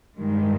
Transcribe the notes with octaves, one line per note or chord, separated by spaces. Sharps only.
G2 D#3 G3 G#3